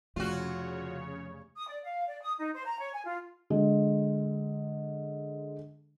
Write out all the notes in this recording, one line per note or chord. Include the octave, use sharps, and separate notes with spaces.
F1 C#3 F3 F4 F#4 C#5
D#6
D5
F5
D5
D#6
D#4
C5
A#5
C#5
G#5
F4
D3 G#3